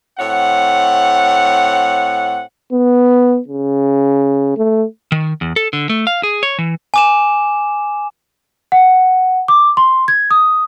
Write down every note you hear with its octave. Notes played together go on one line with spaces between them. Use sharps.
A2 C4 C#5 F#5
B3
C#3
A3
D#3
E2
A4
D3
A3
F5
G#4
C#5
E3
G#5 D6 E7
F#5
D6
C6
G#6
D#6